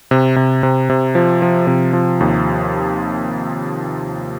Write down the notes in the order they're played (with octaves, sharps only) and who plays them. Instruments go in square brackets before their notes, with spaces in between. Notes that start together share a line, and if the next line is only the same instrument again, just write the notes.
[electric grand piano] C3
C3
C3
C3
F3
F3
C3
F3
D#2